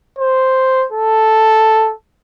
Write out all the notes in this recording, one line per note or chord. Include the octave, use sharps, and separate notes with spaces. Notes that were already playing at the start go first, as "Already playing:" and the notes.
C5
A4